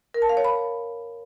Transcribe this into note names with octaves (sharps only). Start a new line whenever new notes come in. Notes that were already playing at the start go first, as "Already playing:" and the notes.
A#4
A5
F5
C#5
B5